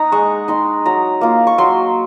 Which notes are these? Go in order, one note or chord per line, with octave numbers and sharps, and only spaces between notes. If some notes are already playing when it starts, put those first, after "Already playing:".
Already playing: D#4 F#5 A#5
G#3 C#6
D#4 C6
F#3 A#5
A#3 F4
C#6
F#3 C6